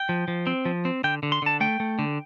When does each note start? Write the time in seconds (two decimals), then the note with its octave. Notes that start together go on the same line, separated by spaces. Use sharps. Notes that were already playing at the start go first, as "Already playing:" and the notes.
Already playing: G5
0.09 F3
0.28 F3
0.47 C4
0.65 F3
0.85 C4
1.04 D3 G5
1.23 D3
1.32 C6
1.42 D3 A5
1.60 A3 G5
1.80 A3
1.99 D3